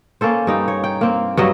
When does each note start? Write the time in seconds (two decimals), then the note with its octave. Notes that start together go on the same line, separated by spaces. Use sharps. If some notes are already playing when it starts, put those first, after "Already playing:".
0.21 A#3 C#4 A4 C5
0.47 G2 D#4 G5
0.68 C#5
0.84 G5
1.01 A#3 C4
1.37 G2 F#3 D#5